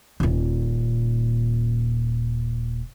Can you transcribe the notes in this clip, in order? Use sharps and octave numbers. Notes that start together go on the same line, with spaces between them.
D#1 A#2